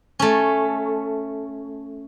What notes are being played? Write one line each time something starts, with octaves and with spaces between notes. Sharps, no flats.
A3 C#4